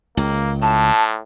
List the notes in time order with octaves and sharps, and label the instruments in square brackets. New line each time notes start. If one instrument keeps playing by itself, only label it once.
[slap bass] C#2 [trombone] A#3
[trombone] A2 [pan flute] A5